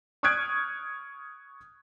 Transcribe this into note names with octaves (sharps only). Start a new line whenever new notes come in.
C#6 D#6 F6 F#6 G#6 D7